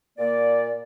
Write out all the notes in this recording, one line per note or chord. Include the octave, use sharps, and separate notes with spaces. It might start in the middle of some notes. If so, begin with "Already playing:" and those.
A#2 A#3 D5